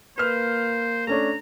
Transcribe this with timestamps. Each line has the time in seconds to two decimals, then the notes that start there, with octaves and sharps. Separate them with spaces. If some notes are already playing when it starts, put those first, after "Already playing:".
0.18 A#3 B4 C5 F6
1.07 A3 C#4 D4 A#5